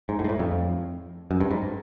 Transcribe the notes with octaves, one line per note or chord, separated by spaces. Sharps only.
G#2
A2
G#2
A2
F2
F#2
G2
G#2